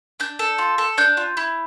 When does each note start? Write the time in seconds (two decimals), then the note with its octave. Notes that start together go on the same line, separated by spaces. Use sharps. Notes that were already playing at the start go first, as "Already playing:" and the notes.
0.20 D4 G6
0.39 A4
0.58 F4
0.78 A4
0.98 D4 G6
1.17 F4
1.37 E4